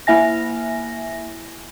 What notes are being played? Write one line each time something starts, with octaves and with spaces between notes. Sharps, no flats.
A#3 E4 E5 G#5 A#6